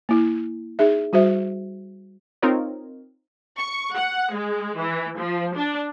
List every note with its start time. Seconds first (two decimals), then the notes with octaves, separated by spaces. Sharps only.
0.09 A#3 E4
0.79 D#4 G#4 E5
1.13 G3 F#4 C5 E5
2.42 C4 D#4 F4 A#4 C#5
3.58 C#6
3.95 F#5
4.34 G#3
4.79 E3
5.18 F3
5.55 D4